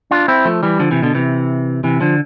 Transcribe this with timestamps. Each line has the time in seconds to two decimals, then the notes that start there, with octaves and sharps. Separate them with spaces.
0.11 D4 F4
0.28 C4 E4
0.45 F3 A3
0.63 E3 G3
0.79 D3 F3
0.91 C3 E3
1.02 B2 D3
1.15 C3 E3
1.84 C3 E3
2.00 D3 F3